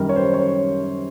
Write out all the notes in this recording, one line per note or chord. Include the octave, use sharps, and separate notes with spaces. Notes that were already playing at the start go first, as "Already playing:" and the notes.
Already playing: F#2 D#3 G3 A#4
C#5
C5
C#5